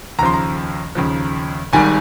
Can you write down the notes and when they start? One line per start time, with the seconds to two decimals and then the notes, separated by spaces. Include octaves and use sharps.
0.19 D#2 A#5
0.21 C#3 F3 C6
0.34 A#5
0.95 D#2 C#3 F3
1.73 G#1 G#2 D#3 G3 G#5